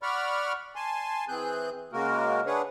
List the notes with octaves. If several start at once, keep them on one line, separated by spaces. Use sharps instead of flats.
D5 F#5 B5 C#6 F6
G#5 A5 C6
E3 C4 G#4 F#6 G6
C#3 G#3 A#3 F#4 A#4
D4 G#4 B4 C#5 F#5